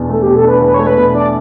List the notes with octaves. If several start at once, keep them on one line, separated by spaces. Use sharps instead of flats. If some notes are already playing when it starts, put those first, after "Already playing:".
Already playing: E2 B2 D4
A3 A4
G4
B2
A4
D4 B4
E2 B4
A3 C#5
B4
B2
D4 D5